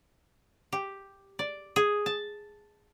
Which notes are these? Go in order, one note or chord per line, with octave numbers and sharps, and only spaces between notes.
G4
D5
G#4
A5